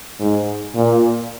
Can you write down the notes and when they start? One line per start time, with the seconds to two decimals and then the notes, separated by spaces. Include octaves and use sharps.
0.20 G#2
0.75 A#2